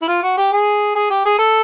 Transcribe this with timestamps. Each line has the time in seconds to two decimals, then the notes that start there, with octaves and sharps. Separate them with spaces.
0.02 E4
0.08 F4
0.23 F#4
0.37 G4
0.53 G#4
0.96 G#4
1.10 G4
1.25 G#4
1.39 A4